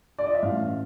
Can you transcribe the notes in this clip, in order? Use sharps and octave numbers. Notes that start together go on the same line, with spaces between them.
D5
D#5
E5
A1 F5